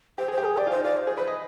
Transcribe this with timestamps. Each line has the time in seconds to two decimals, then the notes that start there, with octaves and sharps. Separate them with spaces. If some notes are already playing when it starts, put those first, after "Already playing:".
0.18 G4 C5
0.28 G#4 C5
0.38 G4
0.44 G#4
0.57 G4 D5
0.67 F4
0.71 D#4 C5
0.84 F4 D5
0.97 C5
1.07 G#4
1.16 B4 C5
1.27 D#5